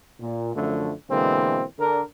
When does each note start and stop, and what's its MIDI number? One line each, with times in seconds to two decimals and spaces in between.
0.20 0.52 46
0.54 0.91 42
0.54 0.91 50
0.54 0.91 53
0.54 0.91 57
1.09 1.63 47
1.09 1.63 50
1.09 1.63 52
1.09 1.63 56
1.09 1.63 58
1.09 1.63 60
1.78 2.01 50
1.78 2.01 62
1.78 2.01 70